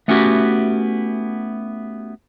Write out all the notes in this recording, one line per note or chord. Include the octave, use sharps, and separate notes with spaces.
A3 B3 C#4 E4 F#4 G4